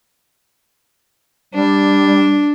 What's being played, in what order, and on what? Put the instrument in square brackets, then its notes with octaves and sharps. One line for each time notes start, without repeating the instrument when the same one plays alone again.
[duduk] G3 [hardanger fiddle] D4